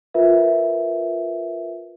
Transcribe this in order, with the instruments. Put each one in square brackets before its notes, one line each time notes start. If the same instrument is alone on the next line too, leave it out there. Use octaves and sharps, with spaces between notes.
[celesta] F4 A#4 B4 E5